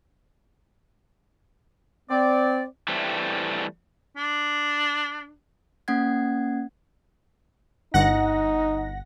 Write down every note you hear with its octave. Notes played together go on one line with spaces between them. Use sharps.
C4 D5
E3 G3 A3 C4
D4
A#3 C#4 F#5 G#6
G1 D#4 F#5 A#6